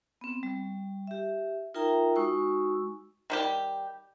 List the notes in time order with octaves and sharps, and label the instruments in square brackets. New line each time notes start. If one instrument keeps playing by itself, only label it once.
[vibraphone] B3 C4
G3
G4 E5
D#4 F4 A#4 E5 G5 A#5
G#3 D#4 F#4 G#5 C#6 E6
[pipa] D#3 G3 G4